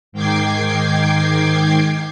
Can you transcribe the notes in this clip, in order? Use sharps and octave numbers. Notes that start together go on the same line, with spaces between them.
G#2 D#3 G5 D6 G#6 C7